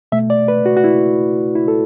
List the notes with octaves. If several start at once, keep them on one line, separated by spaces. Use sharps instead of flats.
B2 A3 E5
D5
B4
F#4
F#4
E4
E4
A4